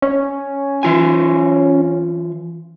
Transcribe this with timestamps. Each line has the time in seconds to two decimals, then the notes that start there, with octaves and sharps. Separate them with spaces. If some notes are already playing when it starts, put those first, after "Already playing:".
0.02 C#4
0.83 E3 F4 G#5